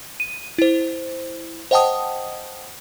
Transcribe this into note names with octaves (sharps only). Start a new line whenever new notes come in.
D#7
E4 C5
C5 D#5 F#5 G5 A5 D#6